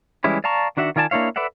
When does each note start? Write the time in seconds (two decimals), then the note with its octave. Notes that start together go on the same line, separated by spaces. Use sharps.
0.24 E3 G3 G#3 C#4 E4
0.44 D5 F5 A5 A#5 C#6
0.77 D#3 D4 F#4 E5 F#5
0.96 D#3 F4 D5 G#5 A5
1.11 A#3 D4 E4 C#5 F5
1.36 A4 B4 D5 E5 F#5